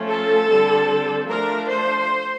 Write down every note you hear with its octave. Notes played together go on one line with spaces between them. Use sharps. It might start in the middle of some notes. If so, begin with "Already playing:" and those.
Already playing: F3 A3 C#4
A4
D3 G3 C4
F3 A3 D4 A#4
C5